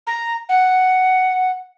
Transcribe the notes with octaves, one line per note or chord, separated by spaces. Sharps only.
A#5
F#5